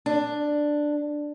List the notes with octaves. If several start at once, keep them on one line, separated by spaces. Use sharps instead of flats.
D4